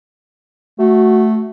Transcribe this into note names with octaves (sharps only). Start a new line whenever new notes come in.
A3 F#4